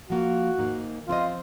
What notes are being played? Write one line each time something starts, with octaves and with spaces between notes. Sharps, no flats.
F3 A#3 F4 F#4
G#2 D#3 A#3 D#4
F3 C4 F4 F#4 C5 D#5